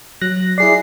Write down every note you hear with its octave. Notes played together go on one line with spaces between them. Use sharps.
F#3 F#6 A#6
E4 G#4 D5 C7